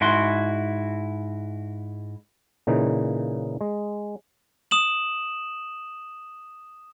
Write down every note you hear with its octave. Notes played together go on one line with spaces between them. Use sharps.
G#2 E4 F#4 C6
A#2 C#3 E3 D#4
G#3
D#6 E7 F#7